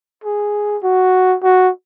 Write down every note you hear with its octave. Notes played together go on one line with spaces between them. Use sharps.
G#4
F#4
F#4